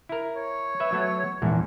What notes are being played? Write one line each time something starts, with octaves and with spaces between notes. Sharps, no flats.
E4 A#4
C#5
B4 E5
F#3 A3 B3
A#1 E2 G#2